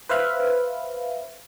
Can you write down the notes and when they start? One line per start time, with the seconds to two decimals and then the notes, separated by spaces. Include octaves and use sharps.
0.09 B4 C5 E5 F5 B5